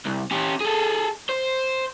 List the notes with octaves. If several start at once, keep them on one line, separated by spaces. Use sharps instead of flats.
C2
C#4 G4
G#4 A4
C5